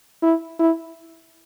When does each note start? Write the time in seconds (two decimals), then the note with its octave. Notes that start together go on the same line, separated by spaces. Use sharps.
0.22 E4
0.59 E4